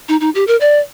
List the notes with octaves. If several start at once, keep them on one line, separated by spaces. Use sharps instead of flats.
D#4
D#4
G4
A#4
D5